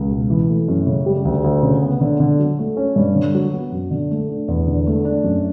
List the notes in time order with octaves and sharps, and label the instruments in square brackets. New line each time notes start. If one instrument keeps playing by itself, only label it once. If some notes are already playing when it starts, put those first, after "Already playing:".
Already playing: [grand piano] C#2
B2
E3
A3
F#2
C#3
G3
D2
D2
C#3
B3
D3
D3
F#3
A3
C#4
G2
D3
F#3
B3
F#2
D3
A3
D4
E2
D3
A3
D4
F#2